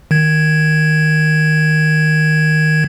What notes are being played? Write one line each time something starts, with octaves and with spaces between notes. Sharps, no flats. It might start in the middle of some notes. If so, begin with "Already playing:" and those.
D#3 G#6